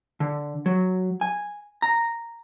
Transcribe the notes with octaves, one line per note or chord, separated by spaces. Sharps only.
D3
F#3
G#5
A#5